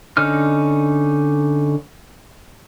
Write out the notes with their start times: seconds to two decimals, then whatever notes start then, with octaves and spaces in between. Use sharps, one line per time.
0.17 D3 C#4 D#4 F6